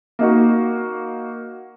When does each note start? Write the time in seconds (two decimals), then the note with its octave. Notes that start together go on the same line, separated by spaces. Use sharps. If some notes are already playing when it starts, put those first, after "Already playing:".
0.19 A#3 D#4 F#4